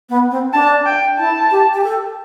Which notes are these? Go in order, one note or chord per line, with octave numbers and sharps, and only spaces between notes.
B3
C4
D4 A5
G5
E4 A5
G4
G4
A4